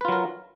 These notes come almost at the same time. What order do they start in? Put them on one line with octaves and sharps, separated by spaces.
B4 F4 F#3 A#4